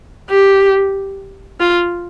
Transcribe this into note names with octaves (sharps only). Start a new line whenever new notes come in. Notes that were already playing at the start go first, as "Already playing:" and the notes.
G4
F4